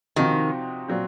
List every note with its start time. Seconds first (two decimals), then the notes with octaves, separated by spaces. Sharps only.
0.16 C3 D#3 F3 C4 D#4 F#4
0.88 A#2 F#3 C4